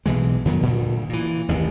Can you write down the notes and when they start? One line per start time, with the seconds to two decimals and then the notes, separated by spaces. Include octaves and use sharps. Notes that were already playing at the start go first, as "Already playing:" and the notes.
0.06 B1 B2 E3 G#3
0.45 F2 D#3 F#3 B3
0.61 D2 A#2 D3
1.09 A#2 E3
1.48 A1 D#2 C3